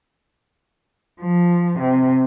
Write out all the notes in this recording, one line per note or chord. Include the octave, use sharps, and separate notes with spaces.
F3
C3